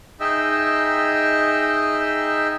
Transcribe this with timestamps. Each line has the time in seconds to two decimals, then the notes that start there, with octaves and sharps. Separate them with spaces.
0.20 D#4 G#4 D#5 E5 G5 E6